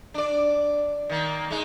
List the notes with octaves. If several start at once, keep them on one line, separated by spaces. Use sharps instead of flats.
D4 D5
D#3 A#3
G#3 D#4